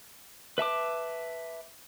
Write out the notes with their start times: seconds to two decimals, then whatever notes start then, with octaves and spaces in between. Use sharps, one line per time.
0.58 B4 E5 A5 D6